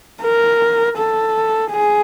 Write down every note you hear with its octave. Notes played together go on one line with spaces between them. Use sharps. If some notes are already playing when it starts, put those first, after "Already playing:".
A#4
A4
G#4